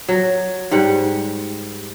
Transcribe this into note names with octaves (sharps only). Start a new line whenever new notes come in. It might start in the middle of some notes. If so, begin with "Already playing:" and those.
F#3
G#2 G3 F#5